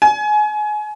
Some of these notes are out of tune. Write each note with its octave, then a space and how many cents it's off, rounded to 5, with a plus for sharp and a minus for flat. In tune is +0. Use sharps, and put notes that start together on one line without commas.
G#5 +25